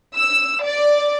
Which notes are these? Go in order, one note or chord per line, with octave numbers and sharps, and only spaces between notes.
E6
D5